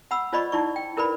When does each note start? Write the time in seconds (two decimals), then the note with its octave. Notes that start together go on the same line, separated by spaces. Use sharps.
0.11 F#5 B5 E6
0.33 F4 C5 D5 D#5 B5 C#6
0.52 D#4 E4 D5 C#6
0.76 G5
0.97 E4 A#4 B4 D5 B5